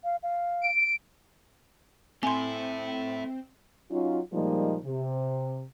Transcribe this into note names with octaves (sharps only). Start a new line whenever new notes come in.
F5
F5
D7
A3 C4 E4 G#5 C6
F#3 C#4 D#4 F4
A#2 F3 G3 G#3 A#3 D#4
C3